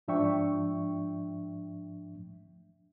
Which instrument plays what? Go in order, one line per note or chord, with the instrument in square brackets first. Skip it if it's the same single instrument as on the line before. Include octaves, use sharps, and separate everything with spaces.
[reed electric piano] G#2 F3 D4 E5 G5 C#6